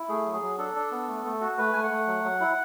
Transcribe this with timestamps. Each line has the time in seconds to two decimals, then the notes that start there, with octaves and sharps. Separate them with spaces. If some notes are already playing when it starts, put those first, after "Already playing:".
Already playing: E4
0.09 A3 G#4
0.26 F#3
0.33 G#4
0.42 F#3
0.58 D4 A4
0.75 D4
0.91 B3
1.08 A3
1.25 A3
1.41 F#4
1.58 A3 B4
1.73 A3 G#5
1.83 F#5
1.91 A3
2.07 F#3
2.24 F#3
2.41 E4